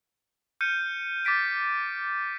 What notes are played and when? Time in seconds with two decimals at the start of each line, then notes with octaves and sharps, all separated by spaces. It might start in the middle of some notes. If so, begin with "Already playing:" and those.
0.61 F6 G6 C#7 D#7
1.25 D6 A6 B6 D7